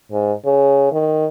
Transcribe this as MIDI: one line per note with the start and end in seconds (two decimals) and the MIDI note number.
0.12 0.33 44
0.45 0.88 49
0.92 1.26 51